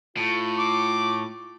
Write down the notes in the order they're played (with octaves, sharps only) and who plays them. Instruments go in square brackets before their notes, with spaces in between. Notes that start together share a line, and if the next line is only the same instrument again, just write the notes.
[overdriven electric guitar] A2 [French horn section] F4
[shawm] D6